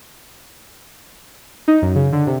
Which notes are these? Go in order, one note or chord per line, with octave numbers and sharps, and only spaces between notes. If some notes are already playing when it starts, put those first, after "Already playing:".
D#4
F#2
C#3
D3
C3